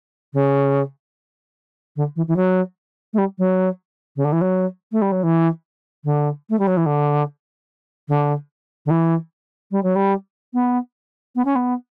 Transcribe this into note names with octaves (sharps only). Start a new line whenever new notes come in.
C#3
D3
E3
E3
F#3
A3
G3
F#3
C#3
D3
E3
F#3
A3
G3
F#3
E3
D3
A3
G3
F#3
E3
D3
D3
D3
E3
G3
F#3
G3
B3
B3
C#4
B3